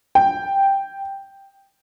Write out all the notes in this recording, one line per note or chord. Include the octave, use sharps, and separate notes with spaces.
G5